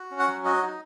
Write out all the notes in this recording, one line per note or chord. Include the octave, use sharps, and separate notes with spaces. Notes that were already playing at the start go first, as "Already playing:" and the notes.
Already playing: F#4
C#4
F#5
F#3
F#4 D#5
D#4